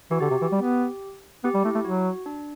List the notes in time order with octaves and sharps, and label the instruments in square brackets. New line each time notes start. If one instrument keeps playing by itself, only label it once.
[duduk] E3 [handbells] F#4
[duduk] D3 [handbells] G4
[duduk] C3
E3
G3
B3
[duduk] B3 [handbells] G4
[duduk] G3
[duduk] A3 [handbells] E4
[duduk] A3
[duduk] F#3 [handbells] F#4
[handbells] D4